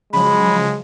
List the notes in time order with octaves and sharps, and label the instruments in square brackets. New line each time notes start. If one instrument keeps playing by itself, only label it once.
[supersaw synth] C#3 F3 F#3 [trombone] G#3 [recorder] B5